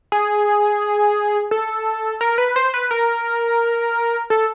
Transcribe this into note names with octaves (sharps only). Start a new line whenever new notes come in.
G#4
A4
A#4
B4
C5
B4
A#4
A4